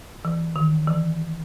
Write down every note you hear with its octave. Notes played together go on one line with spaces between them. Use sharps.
E3
D#3
E3